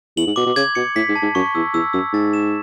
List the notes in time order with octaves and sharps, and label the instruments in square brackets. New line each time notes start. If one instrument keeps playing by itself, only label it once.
[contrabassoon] E2 [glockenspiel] F#7
[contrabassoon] G#2
[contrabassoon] B2 [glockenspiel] D6
[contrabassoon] B2
[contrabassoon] C#3 [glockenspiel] G#6
[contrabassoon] B2 [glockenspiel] C#7
[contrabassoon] A2 [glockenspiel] B6
[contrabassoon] G#2
[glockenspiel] A5
[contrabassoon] G#2
[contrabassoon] F#2 [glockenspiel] C#6
[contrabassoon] E2 [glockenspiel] E6
[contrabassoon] E2 [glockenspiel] E6
[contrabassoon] F#2 [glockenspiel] E6
[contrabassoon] G#2 [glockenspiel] A6
[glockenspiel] E7